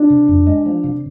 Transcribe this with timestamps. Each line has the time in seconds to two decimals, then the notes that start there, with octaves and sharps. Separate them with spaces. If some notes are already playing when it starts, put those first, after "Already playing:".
Already playing: D4
0.10 C3
0.29 F2
0.47 G#3
0.66 F3
0.84 C3